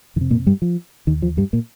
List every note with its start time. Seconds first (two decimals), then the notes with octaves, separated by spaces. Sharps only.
0.16 F2 D#3
0.21 C3
0.31 A#2 A#3
0.46 G2 G3
0.62 F3
1.07 D#2 D#3
1.22 F3
1.37 G2 G3
1.53 A#2 A#3